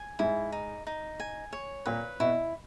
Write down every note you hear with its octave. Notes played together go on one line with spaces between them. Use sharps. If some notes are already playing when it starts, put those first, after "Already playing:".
Already playing: G#5
G#2 E4
D#4
D#4
G#5
C#5
A#2 B4
B2 E4